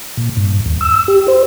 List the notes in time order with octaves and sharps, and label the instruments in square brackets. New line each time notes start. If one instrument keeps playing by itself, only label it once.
[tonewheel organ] A#2
G2
D#2
E6
G4
C5